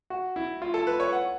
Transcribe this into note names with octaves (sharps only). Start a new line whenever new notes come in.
F#4
E4
F4
A4
B4
C#5
F#5